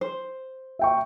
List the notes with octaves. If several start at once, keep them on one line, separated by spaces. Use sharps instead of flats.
C5
E5 G5 C#6